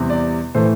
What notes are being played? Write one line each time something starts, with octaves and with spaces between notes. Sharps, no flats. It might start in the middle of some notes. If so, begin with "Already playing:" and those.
Already playing: E2 C3 G3 C4
D5
A2 E3 A3 C5